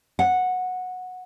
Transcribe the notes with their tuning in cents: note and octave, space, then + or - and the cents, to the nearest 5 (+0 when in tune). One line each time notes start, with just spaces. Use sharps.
F#5 -10